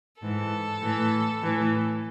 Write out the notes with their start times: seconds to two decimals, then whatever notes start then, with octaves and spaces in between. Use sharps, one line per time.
0.22 G#2 E3 A4
0.82 A2 E3
1.41 A2 E3